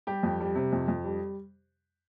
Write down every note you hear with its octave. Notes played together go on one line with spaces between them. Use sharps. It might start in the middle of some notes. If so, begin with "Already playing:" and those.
G3 G4
F2
G3
C3
F2
F2
G3